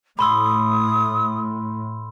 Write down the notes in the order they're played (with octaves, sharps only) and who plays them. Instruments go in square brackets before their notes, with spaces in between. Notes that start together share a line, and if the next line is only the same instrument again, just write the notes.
[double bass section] A2 [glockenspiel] B5 C6 E6 [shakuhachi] D#6